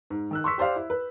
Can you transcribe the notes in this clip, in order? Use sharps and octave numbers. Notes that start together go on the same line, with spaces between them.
G#2
D#3 E6 F#6
C6 C#6 E6 B6
G4 C5 D5 F5
E4
B4